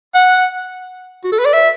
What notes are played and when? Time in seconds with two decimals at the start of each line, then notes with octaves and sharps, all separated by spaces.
0.14 F#5
1.24 F#4
1.32 A4
1.39 B4
1.45 D5
1.53 E5